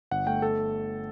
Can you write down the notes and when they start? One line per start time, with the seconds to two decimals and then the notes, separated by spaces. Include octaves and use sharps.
0.11 G1 F#5
0.27 A3 G5
0.42 A4